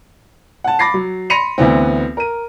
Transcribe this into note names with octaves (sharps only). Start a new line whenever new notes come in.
F#5 A5
B5 D6 A6 A#6 C7
F#3
B5 C6 A#6 C#7 D#7 F7
D2 E3 B3 C4
A#4 D#7